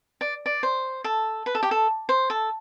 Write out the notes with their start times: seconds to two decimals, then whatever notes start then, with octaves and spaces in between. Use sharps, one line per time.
0.21 D5
0.46 D5
0.63 C5
1.04 A4
1.46 B4
1.55 A4
1.63 G4
1.71 A4
2.09 C5
2.30 A4